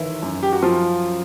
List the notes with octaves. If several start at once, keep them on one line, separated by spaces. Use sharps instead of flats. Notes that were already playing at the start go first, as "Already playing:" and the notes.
Already playing: G1 D#3 E3 E4
F#2
G4
F#4
F3 F#3 F4